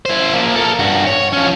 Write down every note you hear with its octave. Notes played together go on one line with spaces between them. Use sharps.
E4 C5
F3 A#3
A4 A#4
G2 F#4
C#5
F3 C#4